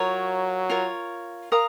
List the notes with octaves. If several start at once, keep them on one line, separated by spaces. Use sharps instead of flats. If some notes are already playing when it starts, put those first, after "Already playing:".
Already playing: F#3 F4 A#4 C#5
F4 A#4 C#5
A#4 F5 A#5 D#6